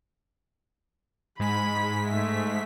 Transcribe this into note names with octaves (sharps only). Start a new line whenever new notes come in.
G#2 G#3 B5 B6
A3 E5